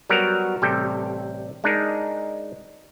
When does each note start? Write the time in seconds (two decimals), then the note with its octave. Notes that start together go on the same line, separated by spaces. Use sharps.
0.10 F#3 G3 B3 F#4 A#4
0.62 A1 C3 G3 A4 G5
1.64 G#3 D4 D#4 A#4